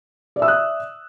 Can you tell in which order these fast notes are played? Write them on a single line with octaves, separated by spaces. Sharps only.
D5 E5 E6 D#6 F#6